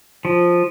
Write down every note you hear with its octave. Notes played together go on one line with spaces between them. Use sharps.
F3